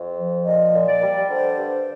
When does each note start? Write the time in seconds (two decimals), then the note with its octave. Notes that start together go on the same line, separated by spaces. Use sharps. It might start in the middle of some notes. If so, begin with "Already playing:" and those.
Already playing: F2
0.18 F3
0.45 A#2 D#5
0.74 A#2
0.88 D5
1.03 G3
1.30 D3 C5
1.59 G2